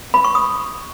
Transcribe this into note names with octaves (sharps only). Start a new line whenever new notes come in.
B5
C#6
D#6